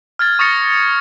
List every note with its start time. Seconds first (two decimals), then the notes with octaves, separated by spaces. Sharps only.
0.19 F6 G#6 A6
0.39 C#6 D#6 A6 A#6 C#7